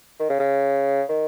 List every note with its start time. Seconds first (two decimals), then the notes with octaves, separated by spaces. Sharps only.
0.19 D#3
0.30 C#3
0.40 C#3
1.09 D#3